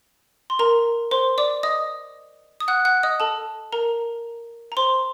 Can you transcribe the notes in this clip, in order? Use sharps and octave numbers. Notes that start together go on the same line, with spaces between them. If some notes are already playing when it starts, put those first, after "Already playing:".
C6
A#4 A#5
C5 C6
D5 D6
D#5 D#6
D#6
F#5 F#6
F#5 F#6
D#5 D#6
A4 A5
A#4 A#5
A#5
C5 C6